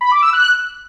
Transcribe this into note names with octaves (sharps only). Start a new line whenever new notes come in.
B5
D6
E6
F#6